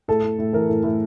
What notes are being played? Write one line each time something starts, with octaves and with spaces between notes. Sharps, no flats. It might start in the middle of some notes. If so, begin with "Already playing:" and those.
A2 A4
A2
A2
E3 A#4
A2
A2